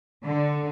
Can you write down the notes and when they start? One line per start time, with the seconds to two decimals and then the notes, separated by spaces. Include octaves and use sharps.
0.24 D3